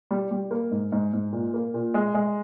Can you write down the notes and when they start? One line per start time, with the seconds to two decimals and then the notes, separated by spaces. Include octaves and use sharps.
0.11 G3
0.31 G3
0.51 A#3
0.71 G#2
0.92 G#2
1.13 G#2
1.32 A#2
1.54 A#3
1.74 A#2
1.94 G#3
2.14 G#3